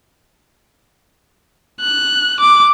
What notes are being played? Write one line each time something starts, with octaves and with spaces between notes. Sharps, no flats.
F#6
D6